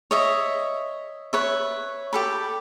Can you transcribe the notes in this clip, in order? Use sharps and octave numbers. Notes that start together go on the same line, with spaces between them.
C#5 D#5 E5
B4 C#5 E5
G4 A4 B5